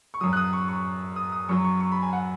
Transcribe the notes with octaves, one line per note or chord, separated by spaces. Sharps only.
C#6
F#2 F#3 D#6
F#6
D#6
C#6
C#6
D#6
D#6
F#2 F#3 C#6
C#6
C#6
B5
G#5
F#5